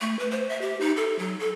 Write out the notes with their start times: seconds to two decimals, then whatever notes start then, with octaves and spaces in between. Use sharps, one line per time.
0.01 A3
0.19 B4
0.31 C5
0.49 E5
0.61 G4
0.80 D#4
0.97 A4
1.19 F#3
1.39 A4